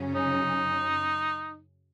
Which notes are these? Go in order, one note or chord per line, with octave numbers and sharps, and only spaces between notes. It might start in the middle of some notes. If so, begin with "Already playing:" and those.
Already playing: F#2 C#3 F#3 C#4
D#4